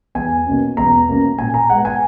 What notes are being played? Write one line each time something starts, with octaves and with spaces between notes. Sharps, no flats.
E2 G#5
B2 A#3 C#4
E2 A#5
B2 A#3 C#4
A#2 G#5
A#5
G#3 F#5
B3
G#5